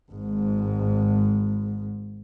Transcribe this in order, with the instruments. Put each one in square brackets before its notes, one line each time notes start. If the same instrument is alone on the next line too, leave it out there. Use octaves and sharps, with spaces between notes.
[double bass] G#1 G#2